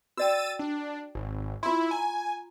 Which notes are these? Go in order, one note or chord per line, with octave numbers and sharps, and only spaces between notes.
F#4 D5 G5 E6 A6 D#7
D4
G#1
E4 F4 C6
G#5 A#5